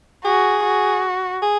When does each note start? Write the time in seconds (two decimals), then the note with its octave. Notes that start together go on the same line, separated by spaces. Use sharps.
0.24 F#4 G#4
0.64 F#4
1.42 G#4